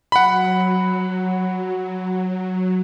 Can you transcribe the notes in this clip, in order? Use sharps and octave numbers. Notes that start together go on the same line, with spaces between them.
F#3 F#5 B5